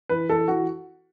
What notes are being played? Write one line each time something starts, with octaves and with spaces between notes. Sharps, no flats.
E3 B4
E3 A4
E3 F#4